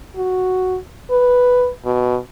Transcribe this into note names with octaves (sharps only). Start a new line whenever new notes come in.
F#4
B4
B2